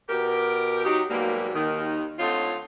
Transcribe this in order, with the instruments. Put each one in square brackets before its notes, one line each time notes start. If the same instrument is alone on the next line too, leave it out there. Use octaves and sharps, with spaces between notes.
[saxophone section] B2 G4 A#4
F#3 D#4 G4
G#2 B2 F#3 G3 A#3
D#2 D#3
D3 A3 C4 D#4 F4 C#5